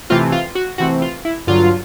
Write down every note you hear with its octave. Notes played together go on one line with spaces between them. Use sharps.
C3 E3 A3 C4 F4
F4
F#4
C3 E3 A3 C4 F#4
F4
E4
G2 D3 F#3 F4